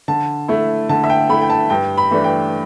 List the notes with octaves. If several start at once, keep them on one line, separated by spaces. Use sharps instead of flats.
D3 A5
A3 E4
D3 A5
E5
G5
A3 E4 B5
G5
A5
G2 G5
B5
E3 A3 D4
G5